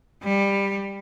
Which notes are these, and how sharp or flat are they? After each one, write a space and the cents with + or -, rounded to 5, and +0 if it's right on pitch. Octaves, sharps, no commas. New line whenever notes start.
G3 +15